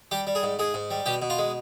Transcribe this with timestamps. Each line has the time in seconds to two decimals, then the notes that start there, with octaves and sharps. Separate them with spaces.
0.11 G3 G4
0.27 G3
0.35 G#4
0.43 G#2
0.59 G#2 G#4
0.74 G#2
0.91 G3
1.06 B2 G4
1.22 B2
1.30 F4
1.38 G#3